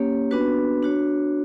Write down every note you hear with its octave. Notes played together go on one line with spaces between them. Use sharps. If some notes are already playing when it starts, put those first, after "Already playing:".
Already playing: A#3 C#4 G4 C#5
B3 D4 F#4 B4
D4 F#4 C#5